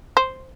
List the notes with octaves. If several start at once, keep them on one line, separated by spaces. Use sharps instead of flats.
C5